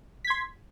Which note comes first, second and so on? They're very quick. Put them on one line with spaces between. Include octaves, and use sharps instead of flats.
B6 G#6 C6